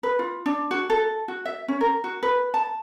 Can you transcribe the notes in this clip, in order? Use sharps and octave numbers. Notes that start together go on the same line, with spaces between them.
B4
F4
D4
F#4
A4
F#4
E5
C#4
A#4
F#4
B4
A5